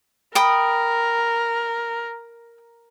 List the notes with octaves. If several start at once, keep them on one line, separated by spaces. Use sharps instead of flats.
A#4 G5 B5 D#6